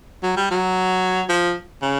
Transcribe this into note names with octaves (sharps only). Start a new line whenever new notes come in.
F#3
G3
F#3
F3
C#3